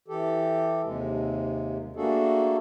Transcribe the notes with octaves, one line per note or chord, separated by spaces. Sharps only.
E3 G4 A4
D#2 C3 G#3
A3 A#3 D4 F#4 G#4 A4